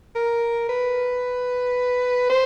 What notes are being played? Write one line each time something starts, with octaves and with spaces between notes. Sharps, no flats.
A#4
B4
C5